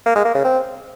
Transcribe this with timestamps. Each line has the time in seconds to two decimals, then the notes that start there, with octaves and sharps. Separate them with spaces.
0.06 A#3
0.15 G#3
0.25 A#3
0.35 C#3
0.44 C4